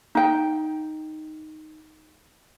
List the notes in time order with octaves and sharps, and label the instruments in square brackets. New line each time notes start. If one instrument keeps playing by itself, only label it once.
[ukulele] D#4 G5